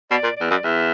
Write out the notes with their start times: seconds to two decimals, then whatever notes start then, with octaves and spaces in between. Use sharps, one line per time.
0.11 B2 D5
0.24 A#2
0.36 E2 D5
0.51 F#2
0.64 E2 E5